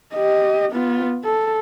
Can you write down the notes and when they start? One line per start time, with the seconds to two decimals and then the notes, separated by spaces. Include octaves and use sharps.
0.14 G4 D#5
0.72 B3 F4
1.24 A4